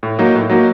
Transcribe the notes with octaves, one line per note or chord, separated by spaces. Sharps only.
A2
F#3 A#3 D#4
A2
F#3 A#3 D#4